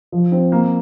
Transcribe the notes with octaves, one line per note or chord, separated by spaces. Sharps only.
F3
C4
A#3